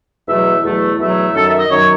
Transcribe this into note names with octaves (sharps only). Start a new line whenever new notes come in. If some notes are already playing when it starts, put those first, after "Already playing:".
E2 B2 F#3 A3 E5
E2 B2 F#3 A3
E2 B2 F#3 A3 E5
F#2 D#3 F#3 A4
E5
D#5
F#2 D#3 F#3 C#5